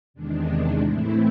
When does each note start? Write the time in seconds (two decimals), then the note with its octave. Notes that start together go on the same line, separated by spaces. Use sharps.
0.14 E2 C3 D#3 G#3 D4
0.80 A2 E3 A3 C4 E4